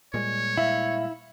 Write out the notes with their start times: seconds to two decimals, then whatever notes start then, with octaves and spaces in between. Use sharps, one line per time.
0.14 A#2 G3 G#3 C#5
0.58 E4 E5 F5